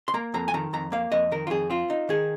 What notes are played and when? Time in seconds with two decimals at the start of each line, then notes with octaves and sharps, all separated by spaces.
0.08 C6
0.14 A#3 A#5
0.34 F2 A#5
0.48 G#5
0.54 D#3 A#5
0.73 F2 A#5
0.92 A#3 F5
1.11 F2 D#5
1.32 D#3 A#4
1.47 F4
1.50 F2 G#4
1.70 C4 F4
1.90 D#4
2.09 D#3 G#4